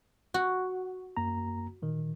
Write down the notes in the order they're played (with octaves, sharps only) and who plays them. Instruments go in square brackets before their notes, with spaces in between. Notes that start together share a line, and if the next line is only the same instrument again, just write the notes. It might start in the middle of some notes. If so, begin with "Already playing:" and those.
[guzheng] F#4
[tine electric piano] F#2 A#3 A#5
A#2 D#3